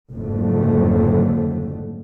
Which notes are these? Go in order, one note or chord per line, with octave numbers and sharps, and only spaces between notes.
F#1 F2 G#2 D3 A3